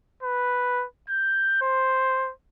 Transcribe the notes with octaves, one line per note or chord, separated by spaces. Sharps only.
B4
G6
C5